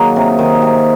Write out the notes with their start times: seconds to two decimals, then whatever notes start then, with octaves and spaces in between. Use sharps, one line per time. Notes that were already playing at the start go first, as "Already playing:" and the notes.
Already playing: D#3 F#3 A#3 G#4 A#4
0.16 C3
0.39 D#3
0.62 C3